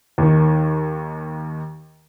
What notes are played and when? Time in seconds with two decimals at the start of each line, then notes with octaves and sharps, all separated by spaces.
0.18 D#2 D#3